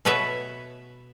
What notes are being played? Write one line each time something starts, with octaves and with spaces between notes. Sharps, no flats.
B2 A4 B4 C#5 E5